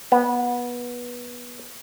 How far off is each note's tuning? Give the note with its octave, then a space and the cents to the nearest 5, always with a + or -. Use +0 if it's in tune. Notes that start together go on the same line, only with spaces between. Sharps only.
B3 -20